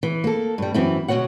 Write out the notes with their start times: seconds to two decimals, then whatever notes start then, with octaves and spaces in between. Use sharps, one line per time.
0.03 E3
0.24 A#3 A4
0.58 G2 G3
0.74 F#2 E3 C4 E4
1.08 D2 B2 A#3 F#4 C#5 F#5